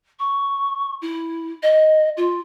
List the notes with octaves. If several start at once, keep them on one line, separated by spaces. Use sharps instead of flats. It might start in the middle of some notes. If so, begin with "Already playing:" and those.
C#6
E4
D#5
F4